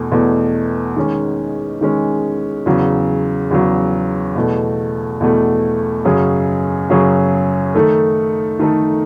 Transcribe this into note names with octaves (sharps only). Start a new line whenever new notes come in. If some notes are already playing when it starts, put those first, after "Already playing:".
Already playing: E2 B2 A3
E2 B2 A3
D#3 G#3 C#4
D#3 G#3 C#4
E2 C#3 F#3
E2 C#3 F#3
E2 B2 A3
E2 B2 A3
F#2 C#3 F#3 C#4 G#4
F#2 C#3 F#3 C#4 G#4
D#3 A3 D#4 A4
D#3 A3 D#4 A4